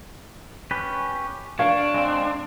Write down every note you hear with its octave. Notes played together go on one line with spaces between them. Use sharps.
C#4 G4 B4
D4 C#5 F5
G#3 C4